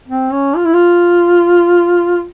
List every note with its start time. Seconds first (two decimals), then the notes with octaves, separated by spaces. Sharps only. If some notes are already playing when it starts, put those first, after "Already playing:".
0.08 C4
0.32 C#4
0.56 F4
0.65 E4
0.74 F4